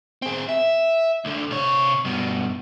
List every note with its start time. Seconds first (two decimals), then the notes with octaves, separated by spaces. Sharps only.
0.22 C4 G#4
0.49 E5
1.25 D2 D3
1.51 C3 C#5
2.05 G2 B2